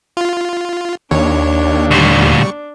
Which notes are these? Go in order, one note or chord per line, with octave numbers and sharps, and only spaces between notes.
F4
D#2 D4 C#5
D2 A#2 G3 C#6